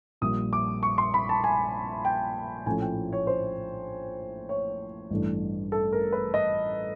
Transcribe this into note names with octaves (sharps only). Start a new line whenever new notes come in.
A#1 A#2 G3 A#3 D#6
D6
C#6
C6
B5
A5
G#5
G5
A#1 A2 F3 A3 C#4 G#5
G5
C#5
C5
C#5
A1 G2 E3 A3 D4
A4
A#4
B4
D#5